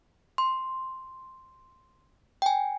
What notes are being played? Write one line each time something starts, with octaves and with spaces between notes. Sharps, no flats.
C6
G5 G#5